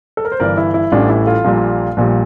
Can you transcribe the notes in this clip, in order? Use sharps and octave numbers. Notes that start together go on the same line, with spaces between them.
A4
A#4
C5
G1 G2 E3 A#4 D5
E4
E4
A1 A2 E3 G3 D4 F4
E4
F4 A4
A#1 A#2 G3 A#3
A#1 A#2 G3